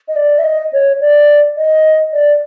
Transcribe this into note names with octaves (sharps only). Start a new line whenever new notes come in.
D#5
D5
E5
D#5
C#5
D5
D#5
D5